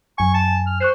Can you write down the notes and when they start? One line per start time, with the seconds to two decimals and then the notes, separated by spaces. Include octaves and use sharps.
0.18 F#2 G#5 C#6
0.34 A5
0.67 F6
0.80 C5 C#6 F#6 C7